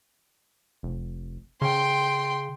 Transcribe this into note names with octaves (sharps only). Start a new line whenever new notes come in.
F1
C#3 G5 C6